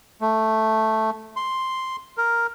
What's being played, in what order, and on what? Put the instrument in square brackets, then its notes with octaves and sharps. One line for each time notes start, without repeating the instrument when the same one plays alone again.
[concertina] A3
C6
A#4